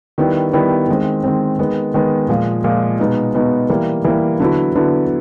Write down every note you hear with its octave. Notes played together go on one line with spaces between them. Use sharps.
D#3 G3 B3 E4
D#3 G3 B3 E4
D#3 G#3 C4
D#3 G#3 C4
D#3 G#3 B3
D#3 G#3 B3
A#2 F3 G#3
A#2 F3 G#3
B2 G#3 B3 D#4
B2 G#3 B3 D#4
E3 G3 A#3
E3 G3 A#3
D3 F#3 B3 E4
D3 F#3 B3 E4